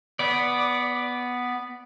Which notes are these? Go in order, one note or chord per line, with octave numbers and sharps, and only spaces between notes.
B3 D5